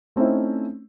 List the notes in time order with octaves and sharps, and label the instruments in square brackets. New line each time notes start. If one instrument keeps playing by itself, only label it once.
[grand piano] A3 C4 C#4 D#4 E4